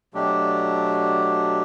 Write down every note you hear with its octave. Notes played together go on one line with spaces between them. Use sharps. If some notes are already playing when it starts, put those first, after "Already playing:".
B2 F#3 A3 D4 G4